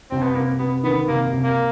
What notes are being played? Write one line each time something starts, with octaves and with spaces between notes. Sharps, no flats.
C2 C4
B3
C2 A#3
C2 B3
D#3 B3
C3 A#3
C2
A#3